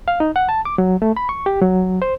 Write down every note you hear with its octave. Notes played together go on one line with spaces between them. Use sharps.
F5
D#4
F#5
A5
D6
F#3
A3
B5
C#6
G4
F#3
C5